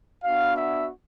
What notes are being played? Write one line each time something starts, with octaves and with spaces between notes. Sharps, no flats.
B3 D4 F#4 F5
E5